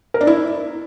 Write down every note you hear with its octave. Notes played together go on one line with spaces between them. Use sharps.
A#4
D4
E4